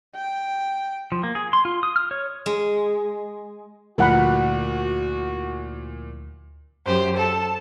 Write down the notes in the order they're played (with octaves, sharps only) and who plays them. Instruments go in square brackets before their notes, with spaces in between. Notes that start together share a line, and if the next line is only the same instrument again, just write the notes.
[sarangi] G5
[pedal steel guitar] F3
A#3
G#4
C6
F4
D#6
F6
C#5
[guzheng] G#3
[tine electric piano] D2 [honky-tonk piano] A#2 F3 E4 [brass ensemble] F#4 [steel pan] A#4 F#5 B5
[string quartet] F#2 G4 [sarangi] C5
[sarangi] A4 [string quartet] A5